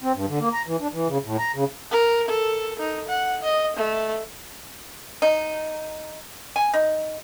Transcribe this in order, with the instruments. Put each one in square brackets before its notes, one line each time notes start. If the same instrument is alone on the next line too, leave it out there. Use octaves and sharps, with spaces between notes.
[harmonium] C4
G2
D3
A#3
A#5
E3
D4
E3
C#3
A2
A#5
C#3
[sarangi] A#4
A4
D#4
F#5
D#5
A3
[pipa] D#4
G#5
D#4